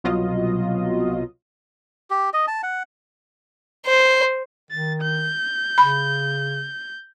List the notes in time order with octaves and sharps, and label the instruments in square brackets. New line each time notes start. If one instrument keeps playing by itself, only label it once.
[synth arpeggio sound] C2 B2 F#3 F4 D#5
[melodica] G4
D#5
A5
F#5
[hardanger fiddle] C5
[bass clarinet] D#3 [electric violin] A6
[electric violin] G6
[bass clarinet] C#3 [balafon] B5